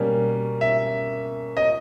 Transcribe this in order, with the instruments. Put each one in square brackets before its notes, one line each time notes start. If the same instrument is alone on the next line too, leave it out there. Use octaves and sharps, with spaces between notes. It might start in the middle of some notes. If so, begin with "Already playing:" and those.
Already playing: [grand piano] B2 G3 A#3 C#4
E5
D#5